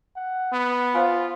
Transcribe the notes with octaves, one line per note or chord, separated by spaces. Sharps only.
F#5
B3
F4 C5 F5 G#5